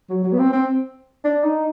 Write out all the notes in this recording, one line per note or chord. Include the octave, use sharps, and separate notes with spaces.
F#3
F#3
B3
C4
C4
D4
D#4